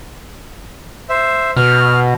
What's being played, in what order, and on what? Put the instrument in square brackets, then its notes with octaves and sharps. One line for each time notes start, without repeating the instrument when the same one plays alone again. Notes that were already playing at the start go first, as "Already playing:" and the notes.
[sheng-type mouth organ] C5 E5
[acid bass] B2 [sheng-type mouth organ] F6